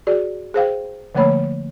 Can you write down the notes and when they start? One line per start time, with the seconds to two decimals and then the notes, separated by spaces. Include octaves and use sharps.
0.07 F#4 G#4 D5
0.54 G#4 C5 F5 G5
1.15 D3 F3 A3 A#3 C#5 B5